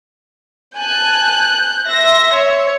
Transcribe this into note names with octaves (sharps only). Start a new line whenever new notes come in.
G#5 A5 F#6 G6
E5 C6 A#6
C#5